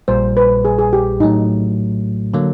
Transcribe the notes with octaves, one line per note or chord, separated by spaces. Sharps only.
A#1 A#2 G3 C5
B4
G#4
G#4
G4
A2 F#3 A3 D#4
D3 F#3 A#3